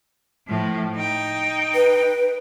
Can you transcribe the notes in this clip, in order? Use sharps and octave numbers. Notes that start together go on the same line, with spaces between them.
A2 F3
D#4 G5
B4